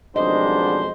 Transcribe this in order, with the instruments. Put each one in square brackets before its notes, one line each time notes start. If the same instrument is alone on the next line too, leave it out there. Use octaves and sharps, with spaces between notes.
[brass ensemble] B1 F2 G#2 [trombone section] D#3 G3 D4 [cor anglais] C5 [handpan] D#5